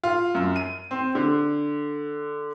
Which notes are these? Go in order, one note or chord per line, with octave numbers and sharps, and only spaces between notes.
F4
F#2
D#7
C4
D3